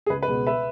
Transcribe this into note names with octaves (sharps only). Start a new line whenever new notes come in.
G#4
C#2 B4
B4
B2 G#3
B4 E5